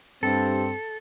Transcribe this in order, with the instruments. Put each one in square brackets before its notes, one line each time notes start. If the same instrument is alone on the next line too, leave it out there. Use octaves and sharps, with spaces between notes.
[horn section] G2 C4 [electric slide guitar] A4